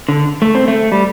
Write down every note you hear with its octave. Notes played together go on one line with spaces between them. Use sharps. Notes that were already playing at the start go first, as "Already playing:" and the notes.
D3
A3
C4
A3
G3